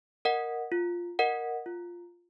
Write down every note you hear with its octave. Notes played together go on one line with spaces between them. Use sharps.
A#4 D#5 F#5
F4
A#4 D#5 F#5
F4